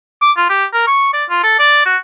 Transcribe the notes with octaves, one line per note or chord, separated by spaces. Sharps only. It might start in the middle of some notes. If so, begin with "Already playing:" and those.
D6
F4
G4
A#4
C#6
D5
F4
A4
D5
F#4